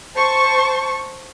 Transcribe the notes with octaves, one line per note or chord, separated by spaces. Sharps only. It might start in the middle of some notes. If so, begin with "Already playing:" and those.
C5 A5 C#6